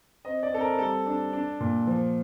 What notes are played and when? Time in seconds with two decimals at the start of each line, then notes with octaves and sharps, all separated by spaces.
0.25 C4 D#5
0.43 D5
0.52 C4 A4
0.61 A#4
0.78 G3 A4
1.06 D4
1.33 D4
1.60 A#2
1.87 F3